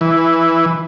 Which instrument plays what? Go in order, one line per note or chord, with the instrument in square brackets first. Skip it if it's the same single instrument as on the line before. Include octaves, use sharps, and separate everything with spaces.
[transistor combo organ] E3